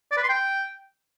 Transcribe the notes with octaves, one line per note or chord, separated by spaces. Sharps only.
D5
B4
C6
G5